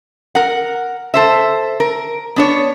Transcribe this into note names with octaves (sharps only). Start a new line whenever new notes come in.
A#4 F#5
A4 C5 E5
A#4
B3 D4 C#5